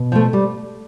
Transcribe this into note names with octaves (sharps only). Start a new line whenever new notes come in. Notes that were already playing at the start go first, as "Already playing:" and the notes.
Already playing: B2
F3 A3
G3